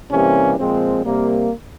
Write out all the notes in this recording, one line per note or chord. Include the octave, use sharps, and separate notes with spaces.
C3 E3 G3 A#3 C#4
A#2 F3 G#3 C4
C3 G3 A#3